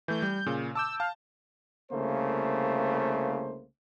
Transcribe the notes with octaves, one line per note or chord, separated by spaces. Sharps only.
E3 A3 G6
G3
A#2 C#3
A5 D6 E6 G6
F5 A5
C2 C#3 A3 A#3 C5